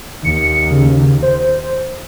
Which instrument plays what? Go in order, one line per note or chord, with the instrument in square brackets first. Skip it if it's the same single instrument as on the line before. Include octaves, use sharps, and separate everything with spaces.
[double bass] D#2 [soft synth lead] C#7
[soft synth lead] C#3
C5